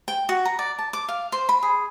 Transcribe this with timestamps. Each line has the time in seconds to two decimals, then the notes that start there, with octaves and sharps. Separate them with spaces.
0.08 G5
0.29 F#4
0.45 A#5
0.59 D5
0.79 A5
0.93 D6
1.08 F5
1.32 C5
1.49 B5
1.63 G#4